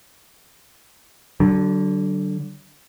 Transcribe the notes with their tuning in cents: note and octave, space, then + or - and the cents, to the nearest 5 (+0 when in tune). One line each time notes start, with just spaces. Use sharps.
D3 +0 F#3 +45